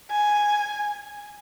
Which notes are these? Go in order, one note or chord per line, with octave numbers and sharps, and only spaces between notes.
G#5